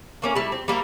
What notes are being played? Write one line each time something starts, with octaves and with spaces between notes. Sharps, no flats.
A3 A#3 C#4
G3 A3 E4
C4
G3 A#3 E4 A#4